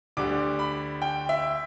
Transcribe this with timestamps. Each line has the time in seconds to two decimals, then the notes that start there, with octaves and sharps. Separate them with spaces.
0.17 D2 D3 G3 D6
0.59 B5
1.02 G5
1.29 E5